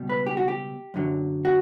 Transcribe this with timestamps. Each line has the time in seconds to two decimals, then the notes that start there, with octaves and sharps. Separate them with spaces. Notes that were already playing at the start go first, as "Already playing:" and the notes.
Already playing: C#2 B2 G3
0.09 B4
0.26 G4
0.37 F#4
0.48 G4
0.94 F#2 D3 F#3
1.45 F#4